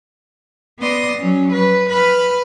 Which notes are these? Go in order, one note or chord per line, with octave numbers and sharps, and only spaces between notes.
B3 D5 C6 D#6 A#6
F#3 C#4
B4
B4 B5 F6